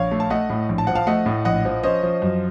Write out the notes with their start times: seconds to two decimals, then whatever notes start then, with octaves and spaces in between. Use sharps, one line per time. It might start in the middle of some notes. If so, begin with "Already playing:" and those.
Already playing: A#1 C#5 F5
0.11 A3
0.20 A5
0.30 A3 D#5 F#5
0.50 A2
0.69 A#1
0.78 A5
0.87 F3 F#5
0.95 F5 A5
1.07 A3 D#5 F#5
1.26 A2
1.45 A#1 D#5 F#5
1.65 F3
1.83 C#4 C5 D#5
2.03 F3
2.22 F#2